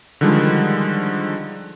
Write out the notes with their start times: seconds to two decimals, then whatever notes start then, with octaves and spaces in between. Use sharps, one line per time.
0.21 D3 D#3 F3 G3 G#3